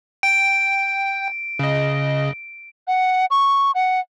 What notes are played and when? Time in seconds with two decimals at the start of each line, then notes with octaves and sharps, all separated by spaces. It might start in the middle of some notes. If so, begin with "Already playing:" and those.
0.23 G5 D7
1.59 C#3 D#5
2.88 F#5
3.31 C#6
3.75 F#5